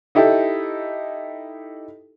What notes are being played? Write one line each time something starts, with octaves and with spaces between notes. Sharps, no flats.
D#4 E4 G4 A4